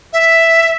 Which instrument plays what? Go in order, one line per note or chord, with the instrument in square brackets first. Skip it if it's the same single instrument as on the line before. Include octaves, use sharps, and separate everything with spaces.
[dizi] E5